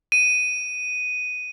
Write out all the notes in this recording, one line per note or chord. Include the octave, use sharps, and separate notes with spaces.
D#7